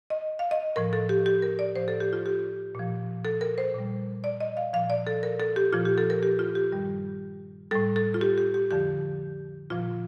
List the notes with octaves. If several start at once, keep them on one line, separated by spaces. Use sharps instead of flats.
D#5
F5
D#5
A2 F3 A#4
A4
G4
G4
A#4
D5
A2 F3 C5
A4
G4
F4
G4
A#2 F3
A4
A#4
C5
A#2 G3
D5
D#5
F5
A#2 F3 F5
D5
A4
A#4
A4
G4
A#2 F3 F4
G4
A4
A#4
G4
F4
G4
G2 D#3 G3
A2 G3 A4
A4
F4
G4
G4
G4
F2 D3 F3 G4
A#2 F3 F4